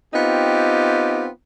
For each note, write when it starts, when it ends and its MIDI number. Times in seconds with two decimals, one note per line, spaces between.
0.14 1.28 59
0.14 1.28 60
0.14 1.28 63
0.14 1.28 65
0.14 1.28 67